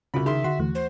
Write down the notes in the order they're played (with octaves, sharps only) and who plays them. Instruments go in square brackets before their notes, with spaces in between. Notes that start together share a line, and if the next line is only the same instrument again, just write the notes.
[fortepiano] C2 B5 [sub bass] C#3 [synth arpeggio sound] C#4 F4 F#4
[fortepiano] D#3 C6 [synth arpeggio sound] G#4 [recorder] E5
[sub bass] D3 [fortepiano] F#4 [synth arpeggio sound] C6
[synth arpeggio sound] D#2 E3 A3
[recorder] C5